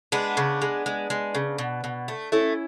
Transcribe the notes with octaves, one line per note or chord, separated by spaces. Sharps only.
G#3 B3 D4
C#3
G#3
G#3
G#3
C#3
B2
B2
A3
A3 C#4 E4